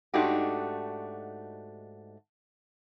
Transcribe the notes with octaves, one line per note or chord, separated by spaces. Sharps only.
G#2 A3 D4 D#4 F#4 G4